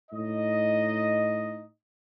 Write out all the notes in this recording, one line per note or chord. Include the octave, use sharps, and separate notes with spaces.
A2 D#4 D#5